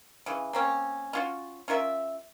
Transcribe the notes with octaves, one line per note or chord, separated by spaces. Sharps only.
C#3 E3
A#3 C4 C#4
C#4 F4 F#4
C#4 F4 A#4 E5